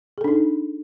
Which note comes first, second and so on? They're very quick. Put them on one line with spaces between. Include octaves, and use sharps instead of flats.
G#4 A4 D4 D#4